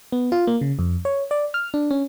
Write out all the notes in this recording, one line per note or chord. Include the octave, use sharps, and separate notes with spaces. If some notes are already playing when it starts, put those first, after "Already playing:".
B3
F4
A#3
C#3
F2
C#5
D5
F6
D4
C#4